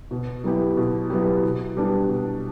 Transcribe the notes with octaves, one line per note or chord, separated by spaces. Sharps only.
B2
F#3 B3 E4 G4
B2
F#3 B3 E4 G4
B2
G3 B3 D4
B2